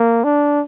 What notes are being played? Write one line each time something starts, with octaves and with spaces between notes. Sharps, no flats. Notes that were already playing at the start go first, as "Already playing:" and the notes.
Already playing: A#3
D4